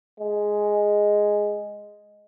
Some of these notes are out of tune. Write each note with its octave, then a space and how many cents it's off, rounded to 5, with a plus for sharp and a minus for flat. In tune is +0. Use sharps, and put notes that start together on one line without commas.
G#3 +0